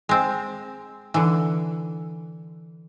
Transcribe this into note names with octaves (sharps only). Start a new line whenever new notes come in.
G#3 C4
D3 E3